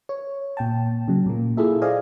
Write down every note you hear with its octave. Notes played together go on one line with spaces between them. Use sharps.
C#5
A#2 G5 A5
C#3 F#3
A#2 A#3
E4 F4 G#4 A4 E5
C5 D5 D#5 F5 G#5